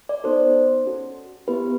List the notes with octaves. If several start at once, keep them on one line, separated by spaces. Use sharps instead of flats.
D5
B3 D#4 F#4 A4 C5
C#4 F#4 A4
B3 E4 G4 B4